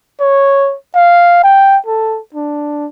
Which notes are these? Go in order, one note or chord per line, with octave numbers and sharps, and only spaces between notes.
C#5
F5
G5
A4
D4